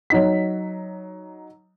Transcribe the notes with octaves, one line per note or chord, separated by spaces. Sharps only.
F#3 D#4 B6